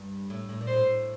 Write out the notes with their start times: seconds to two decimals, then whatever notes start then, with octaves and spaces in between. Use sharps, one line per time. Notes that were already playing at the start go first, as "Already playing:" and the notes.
Already playing: G2
0.30 A2
0.49 A2
0.61 A#2
0.67 C5
0.73 A2